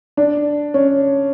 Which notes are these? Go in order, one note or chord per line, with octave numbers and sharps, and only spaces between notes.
D4
C#4